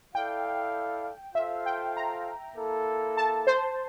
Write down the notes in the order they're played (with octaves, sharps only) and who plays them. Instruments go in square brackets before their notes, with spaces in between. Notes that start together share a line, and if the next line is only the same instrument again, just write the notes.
[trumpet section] E4 A4 D5 F5 [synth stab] G5
[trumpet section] F4 A4 C5 F5 [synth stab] E5
[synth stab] G5
A#5
[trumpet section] A#3 E4 A4
[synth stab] A5
C5